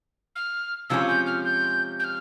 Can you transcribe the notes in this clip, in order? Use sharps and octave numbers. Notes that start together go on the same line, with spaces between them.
F6
C3 F3 G#3 C#4 F4 E6
G6
F6
G6
G6
F6